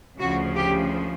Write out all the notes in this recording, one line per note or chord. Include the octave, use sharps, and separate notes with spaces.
D2 C#3 F3 F#4
G4